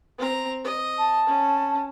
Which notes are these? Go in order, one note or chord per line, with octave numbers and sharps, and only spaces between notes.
C4 A#5
D#5
A5
C#4